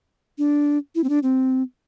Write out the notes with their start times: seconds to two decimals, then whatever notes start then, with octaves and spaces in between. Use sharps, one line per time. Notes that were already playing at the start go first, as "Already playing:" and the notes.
0.38 D4
0.95 E4
1.04 C4
1.09 D4
1.23 C4